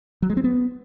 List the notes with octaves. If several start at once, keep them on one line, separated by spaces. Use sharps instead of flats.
F#3
G#3
C4
B3